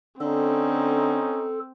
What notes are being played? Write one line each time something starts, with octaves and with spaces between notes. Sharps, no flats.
D3 C4 C#4 D#4 A4